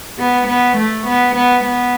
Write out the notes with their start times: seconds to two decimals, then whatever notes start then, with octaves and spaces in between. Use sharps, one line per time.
0.19 B3
0.47 B3
0.77 A3
1.06 B3
1.35 B3
1.65 B3